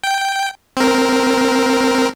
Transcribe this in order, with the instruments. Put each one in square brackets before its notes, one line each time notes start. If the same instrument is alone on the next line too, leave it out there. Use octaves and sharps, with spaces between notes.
[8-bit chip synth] G5
C4 A#4